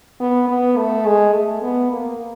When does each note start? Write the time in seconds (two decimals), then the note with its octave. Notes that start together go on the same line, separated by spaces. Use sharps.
0.20 B3
0.48 B3
0.77 A3
1.06 G#3
1.33 A3
1.62 B3
1.91 A#3